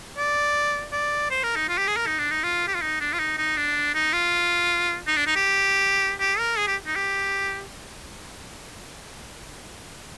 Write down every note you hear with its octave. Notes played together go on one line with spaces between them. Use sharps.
D5
D5
C5
A#4
D#4
F4
G4
G#4
A#4
D#4
D4
D#4
F4
G4
F4
D#4
D4
F4
D#4
D#4
D4
D#4
F4
D#4
D4
D#4
G4
G4
A#4
G#4
G4
D#4
G4